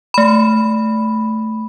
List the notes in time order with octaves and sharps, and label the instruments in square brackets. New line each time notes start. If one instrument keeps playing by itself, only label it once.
[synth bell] A3 B5